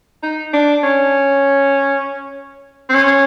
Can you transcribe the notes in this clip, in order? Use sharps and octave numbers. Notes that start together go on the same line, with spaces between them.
D#4
D4
C#4
C4
C#4